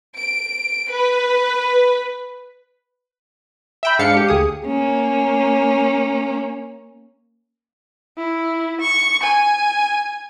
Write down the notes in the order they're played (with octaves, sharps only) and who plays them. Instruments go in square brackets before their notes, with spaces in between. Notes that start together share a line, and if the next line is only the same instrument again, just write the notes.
[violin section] D7
B4
[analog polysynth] E5 G5 B5
G#2 D4 F5 C#7
G4
D2 G#4 D#6
[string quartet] A#3 C#4
[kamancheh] E4
C#6
G#5